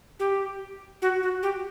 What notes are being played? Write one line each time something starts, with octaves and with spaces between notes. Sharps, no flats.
G4
F#4
F#4
G4